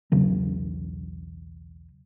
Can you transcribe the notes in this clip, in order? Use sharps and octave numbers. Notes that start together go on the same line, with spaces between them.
B1 E2 C#3 F#3